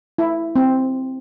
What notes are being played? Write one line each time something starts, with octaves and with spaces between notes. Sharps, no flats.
E4
C4